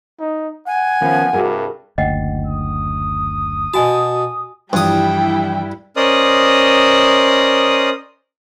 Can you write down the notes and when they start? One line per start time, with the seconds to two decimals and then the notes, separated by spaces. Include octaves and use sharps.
0.20 D#4
0.67 F#5 G#5
1.01 D#3 F3 B3 C#4
1.33 C2 G2 G3 F#4 G#4 A#4
1.98 F#1 D2 D#5 F#5 G5
2.46 D#6
3.74 B2 F#4 G#5 A5
4.73 G2 E3 F3 G3 D4 E4 G5 D#6
5.96 C#4 A#4 C5 D5 D#5 D#6